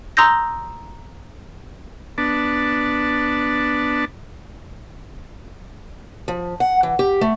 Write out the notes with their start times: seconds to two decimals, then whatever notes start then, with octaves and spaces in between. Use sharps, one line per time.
0.17 A#5 C6 D#6 E6 G6 A#6
2.18 B3 D4 A5
6.28 F3
6.60 F#5
6.83 E3
6.99 G4
7.21 A3